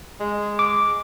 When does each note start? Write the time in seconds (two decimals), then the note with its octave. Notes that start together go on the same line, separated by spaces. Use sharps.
0.20 G#3
0.59 D6